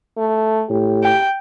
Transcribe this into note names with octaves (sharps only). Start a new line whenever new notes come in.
A3
A2 G4
G5